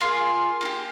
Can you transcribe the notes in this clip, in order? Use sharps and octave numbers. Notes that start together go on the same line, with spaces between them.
A#3 F4 G#4 C6
A#3 D#4 G4